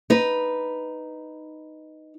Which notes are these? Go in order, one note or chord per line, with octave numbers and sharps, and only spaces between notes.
D#4 B4